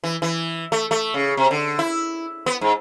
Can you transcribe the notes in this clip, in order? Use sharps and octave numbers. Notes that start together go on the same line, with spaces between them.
E3
E3
A3
A3
C#3
C3
D3
E4
B3
G#2